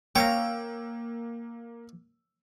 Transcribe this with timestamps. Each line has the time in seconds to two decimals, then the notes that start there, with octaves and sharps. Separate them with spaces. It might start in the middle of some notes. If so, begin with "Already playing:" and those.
0.16 A#3 C#5 F5 G5 A#5 E6